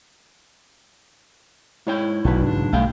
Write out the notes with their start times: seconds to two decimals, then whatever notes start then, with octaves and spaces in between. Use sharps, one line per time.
1.87 G#2 E4 C#5 G5
2.25 B1 D#3 F#3 B3
2.43 G#2 C#3 D4
2.73 B1 G3 A3 F5 G5